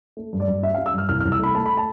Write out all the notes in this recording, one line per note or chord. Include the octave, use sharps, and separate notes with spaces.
A3
G2
D5
G2
G3 E5
G3 F5
E6
G2 F6
C2 F6
C2 F6
E6
A3 B5
A3 A5
B5
A5